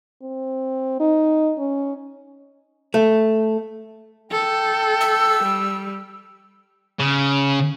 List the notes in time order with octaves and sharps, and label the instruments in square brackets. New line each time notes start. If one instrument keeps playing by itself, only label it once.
[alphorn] C4
D#4
C#4
[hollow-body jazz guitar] A3
[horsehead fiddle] A4 [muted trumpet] G5
[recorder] E6
[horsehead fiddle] G3
[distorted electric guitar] C#3